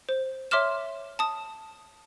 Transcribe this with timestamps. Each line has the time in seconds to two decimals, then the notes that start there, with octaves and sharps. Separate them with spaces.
0.09 C5
0.51 C#5 E5 C6 D6 F6 E7
1.19 A5 D#6